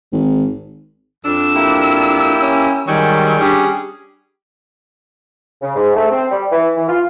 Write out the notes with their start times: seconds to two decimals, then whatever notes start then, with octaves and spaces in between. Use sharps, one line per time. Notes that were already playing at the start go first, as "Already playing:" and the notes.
0.12 G#1
1.24 F2 D4 E6
1.55 A#3 E4 G4
2.41 C#4
2.88 G#2 D#3 F#3 G3 G5 G#5 C#6
3.41 G3 C#4 D4 G4 G#4
5.62 C#3
5.75 G#2
5.95 A3
6.11 C4
6.32 G3
6.52 E3
6.76 E3
6.89 F4